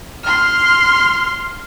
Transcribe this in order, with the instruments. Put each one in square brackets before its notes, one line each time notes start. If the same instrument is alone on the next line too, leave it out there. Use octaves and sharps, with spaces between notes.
[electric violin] C6 F6